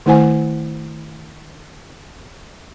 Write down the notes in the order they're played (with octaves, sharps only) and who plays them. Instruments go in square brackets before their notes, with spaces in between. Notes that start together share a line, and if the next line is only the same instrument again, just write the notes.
[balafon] D#3 A3 E4 C5 F#5 G#5